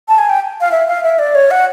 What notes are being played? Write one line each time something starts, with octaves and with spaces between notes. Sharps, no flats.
A5
G#5
G5
F5
E5
F5
E5
D5
C#5
F#5